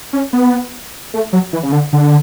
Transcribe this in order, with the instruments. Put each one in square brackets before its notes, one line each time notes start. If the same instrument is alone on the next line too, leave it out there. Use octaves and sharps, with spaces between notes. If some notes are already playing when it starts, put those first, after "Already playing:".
[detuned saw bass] C#4
B3
A3
F#3
E3
C#3
D3
D3